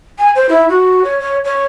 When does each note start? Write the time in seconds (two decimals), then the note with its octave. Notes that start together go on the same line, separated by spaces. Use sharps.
0.19 G#5
0.35 C5
0.49 E4
0.69 F#4
1.04 C#5
1.20 C#5
1.45 C#5